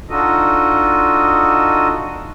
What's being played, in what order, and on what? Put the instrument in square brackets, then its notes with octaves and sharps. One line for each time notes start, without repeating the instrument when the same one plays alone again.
[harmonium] D4 D#4 F4 F#4 A4 D#5